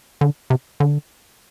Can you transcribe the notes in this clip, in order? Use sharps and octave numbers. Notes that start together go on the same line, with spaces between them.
D3
C3
D3